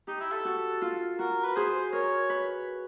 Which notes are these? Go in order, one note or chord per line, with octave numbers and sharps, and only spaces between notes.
D#4 G4
E4
A4
F#4
F4
F#4 A#4
B4
G#4 C5
A#4 C#5
B4